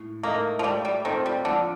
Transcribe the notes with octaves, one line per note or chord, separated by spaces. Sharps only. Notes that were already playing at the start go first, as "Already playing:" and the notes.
Already playing: A2
A3 A#3 D#4 A#4 D#5
F3
G3 A3
G3
D#3 C4 F4 A4 C5
G3
D3 F3